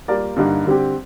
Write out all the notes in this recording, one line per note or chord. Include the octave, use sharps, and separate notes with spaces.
G3 A#3 F4 A#4 D5
G2 D3 G3 A#3 D#4
D3 G3 C4 G4